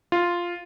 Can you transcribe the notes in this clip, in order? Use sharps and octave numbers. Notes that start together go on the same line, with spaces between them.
F4